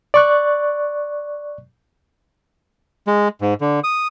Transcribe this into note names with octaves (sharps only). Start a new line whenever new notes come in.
D5 C#6 F#6
G#3
G#2
D3
D#6